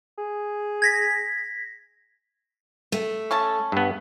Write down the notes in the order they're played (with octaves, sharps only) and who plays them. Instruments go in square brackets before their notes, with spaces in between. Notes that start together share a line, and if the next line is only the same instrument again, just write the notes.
[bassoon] G#4
[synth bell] G#6 A#6 B6
[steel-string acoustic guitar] A3
[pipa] C#4 A4 A5
[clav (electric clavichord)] G2 B3